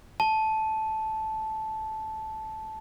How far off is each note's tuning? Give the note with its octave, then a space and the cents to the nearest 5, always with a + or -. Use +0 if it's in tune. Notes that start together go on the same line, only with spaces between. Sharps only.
A5 -10